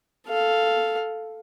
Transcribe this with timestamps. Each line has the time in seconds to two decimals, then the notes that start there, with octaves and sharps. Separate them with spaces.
0.28 A4 F5